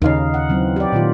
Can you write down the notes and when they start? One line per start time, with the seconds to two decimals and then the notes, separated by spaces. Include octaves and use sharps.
0.02 D#2 C#3 D#4 F5
0.34 F#5
0.49 E3 F#3 C4
0.76 G4 D5
0.92 A#2 D#3 F4